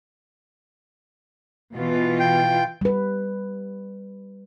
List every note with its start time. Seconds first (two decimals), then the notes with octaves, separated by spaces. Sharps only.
1.73 B2 E3 F4
2.20 G5
2.81 G3 B4